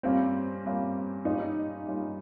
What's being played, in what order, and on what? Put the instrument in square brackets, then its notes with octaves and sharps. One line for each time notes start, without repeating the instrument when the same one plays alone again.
[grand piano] G2 G3 A#3 C#4 F4 [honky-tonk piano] C4
[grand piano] G2 G3 A#3 C#4 F4
[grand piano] G2 G3 A#3 C#4 F4 [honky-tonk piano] D#4
[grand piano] G2 G3 A#3 C#4 F4